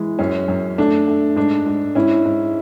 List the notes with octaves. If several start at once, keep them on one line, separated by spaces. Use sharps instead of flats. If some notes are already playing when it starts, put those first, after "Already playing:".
Already playing: E3 G#3
F#2 C#4
F#2
A3 D4
A3
G#2 D4
G#2
G#2 C#4 E4
G#2